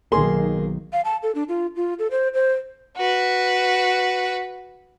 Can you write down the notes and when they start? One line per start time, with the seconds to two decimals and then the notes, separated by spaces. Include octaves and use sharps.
0.12 B1 D#3 A#3 G#4 C6
0.93 F5
1.05 A5
1.23 A4
1.35 D4
1.49 F4
1.76 F4
1.99 A4
2.11 C5
2.34 C5
2.97 F#4 B4